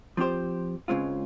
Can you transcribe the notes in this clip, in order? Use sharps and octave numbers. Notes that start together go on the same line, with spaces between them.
F3 C4 G4 C5
C#2 C#3 G#3 C4 F4